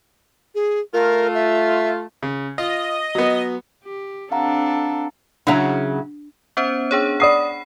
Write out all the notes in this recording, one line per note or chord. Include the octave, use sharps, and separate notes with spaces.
G#4
A3 F4 A#4
E5
C#3
F4 D#5
F#3 B3
G4
C4 D4 A4 F5 F#5 A#5
C#3 F#3 D4 E4 E5 A#5
B3 C#4 C5
D4 G#4 C#5
D5 F#5 B5 D#6 C7